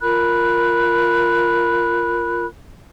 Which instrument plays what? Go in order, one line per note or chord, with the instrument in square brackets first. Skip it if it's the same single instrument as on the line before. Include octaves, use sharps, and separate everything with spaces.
[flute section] F4 A#4 B5 F#6